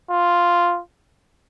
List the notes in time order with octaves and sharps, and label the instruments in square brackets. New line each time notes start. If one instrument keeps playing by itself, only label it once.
[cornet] F4